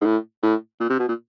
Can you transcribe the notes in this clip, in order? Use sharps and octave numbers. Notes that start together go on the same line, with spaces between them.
G#2
A2
A2
A#2
C3
B2
A#2